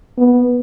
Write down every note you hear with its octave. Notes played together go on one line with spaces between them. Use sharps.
B3